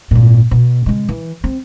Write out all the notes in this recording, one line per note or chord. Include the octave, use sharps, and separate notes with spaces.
G#1 A#2
B2
C#3 G#3
E3
C4